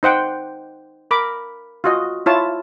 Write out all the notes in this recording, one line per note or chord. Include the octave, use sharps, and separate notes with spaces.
D#4 C5 F#5 G5 C6
A#4 B5 D6
F4 F#4 D#5
E4 F4 C#5 A5